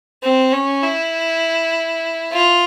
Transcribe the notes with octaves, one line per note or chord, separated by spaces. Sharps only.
C4
C#4
E4
F4